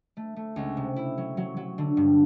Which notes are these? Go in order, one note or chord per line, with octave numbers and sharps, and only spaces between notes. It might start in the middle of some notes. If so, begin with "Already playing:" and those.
A3
A3
C#2
C3
E4
F#3
F#3
F#3
D3
G2